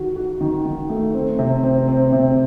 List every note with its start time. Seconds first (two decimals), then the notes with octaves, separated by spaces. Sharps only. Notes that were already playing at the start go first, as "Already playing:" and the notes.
Already playing: D#3 F#4
0.16 F#4
0.41 D#3
0.65 D#3
0.89 A3
1.14 C4
1.39 C3
1.64 C4
1.88 C4
2.12 C3